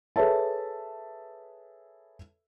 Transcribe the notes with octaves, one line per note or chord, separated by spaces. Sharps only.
G#4 A4 B4 C#5 E5 A5